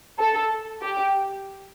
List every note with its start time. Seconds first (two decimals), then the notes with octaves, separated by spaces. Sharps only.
0.19 A4
0.82 G4